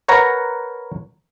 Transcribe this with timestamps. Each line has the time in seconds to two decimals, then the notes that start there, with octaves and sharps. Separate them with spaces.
0.08 A#4 B4 C#5 F#5 A#5